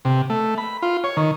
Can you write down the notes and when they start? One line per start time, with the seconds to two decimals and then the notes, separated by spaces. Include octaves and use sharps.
0.05 C3
0.30 A3
0.58 B5
0.82 F4
1.04 C#5
1.17 D#3